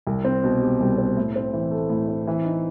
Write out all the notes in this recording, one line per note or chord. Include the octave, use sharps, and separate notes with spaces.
C2
C4
B2
G3
C2
C4
A2
C4
E3
A3
A2
C4
E3
D#4